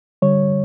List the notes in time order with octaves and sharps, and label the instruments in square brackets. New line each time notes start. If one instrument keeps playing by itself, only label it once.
[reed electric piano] D3 G3 C#5